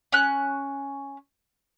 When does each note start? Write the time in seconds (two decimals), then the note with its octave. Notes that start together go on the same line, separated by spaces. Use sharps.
0.12 C#4 F#6